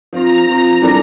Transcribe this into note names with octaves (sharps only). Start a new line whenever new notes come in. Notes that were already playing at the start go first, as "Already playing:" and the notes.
F3 C4 F4 A#5
F3 C4 F4
E3 G3 D4 A4